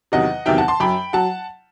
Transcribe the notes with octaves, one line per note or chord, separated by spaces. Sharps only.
E2 C3 D#3 F#3 D#5 F#5
E2 C3 D#3 F#3 E5 G5
F#5 A5
A5 C6
F#2 F#3 G5 B5
F#3 F#5 A5